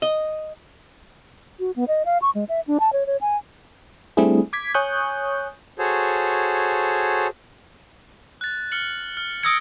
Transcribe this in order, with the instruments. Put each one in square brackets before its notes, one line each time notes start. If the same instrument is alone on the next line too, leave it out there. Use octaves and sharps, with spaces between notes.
[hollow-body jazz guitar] D#5
[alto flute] F#4
B3
D#5
F5
C#6
G#3
E5
D4
A5
C#5
C#5
G#5
[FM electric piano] G3 A3 C4 D4 E4 G#4
D6 G#6 B6
C#5 G#5 C#6 D#6 F#6 G6
[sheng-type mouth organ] F#4 G#4 A4 C5 C#5
[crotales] F#6 A6
F6 C#7 F#7
F6
[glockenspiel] D#6 E6 C#7 [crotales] G#6 A#6 D7